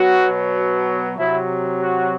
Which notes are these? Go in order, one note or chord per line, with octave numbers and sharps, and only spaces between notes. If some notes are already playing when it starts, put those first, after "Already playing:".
Already playing: B2 F#3 F#4
C3 F#3 E4
F#4